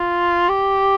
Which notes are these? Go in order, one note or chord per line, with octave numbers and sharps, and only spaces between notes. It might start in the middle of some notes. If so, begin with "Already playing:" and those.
Already playing: F4
G4